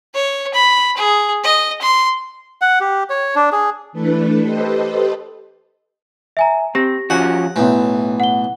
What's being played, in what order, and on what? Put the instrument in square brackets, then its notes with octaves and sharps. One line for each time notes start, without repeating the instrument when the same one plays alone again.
[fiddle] C#5
B5
G#4
D#5
C6
[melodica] F#5
G4
C#5
D4
G#4
[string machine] E3 A3 D4 A4 B4
G4 A4 B4 C5 D#5
[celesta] E5 G#5 A#5
[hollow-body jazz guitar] C4 [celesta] G4 A#6
[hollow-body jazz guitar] F3 C#4 F#4 [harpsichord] F#5
[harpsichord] B1 E3 [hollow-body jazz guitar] A2
[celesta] F#5 G7